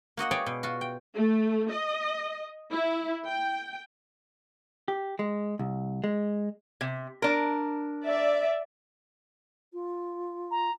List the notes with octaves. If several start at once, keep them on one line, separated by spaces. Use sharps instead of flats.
A#3 F#4 D#5 F#5
G#4 B4 C#5 D5 G5
B2
F4 F#4
G5
A3
D#5
E4
G5
G4
G#3
C2
G#3
C3
D4 A#4
D5 E5
F4
A#5